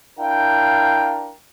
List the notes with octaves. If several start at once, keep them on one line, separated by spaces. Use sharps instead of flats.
D4 E4 A#4 F5 G5